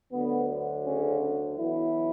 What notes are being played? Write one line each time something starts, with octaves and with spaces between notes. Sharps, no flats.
D2 D3 F#3 B3
C#3 C#4
B1 B2 E3 F#3 E4